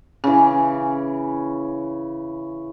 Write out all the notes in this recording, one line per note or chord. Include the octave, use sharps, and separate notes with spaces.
C#3 E3